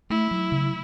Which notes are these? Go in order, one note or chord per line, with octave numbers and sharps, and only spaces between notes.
A3 E4
F#3
C#3